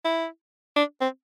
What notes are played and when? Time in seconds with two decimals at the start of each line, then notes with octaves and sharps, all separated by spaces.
0.05 E4
0.76 D4
1.01 C4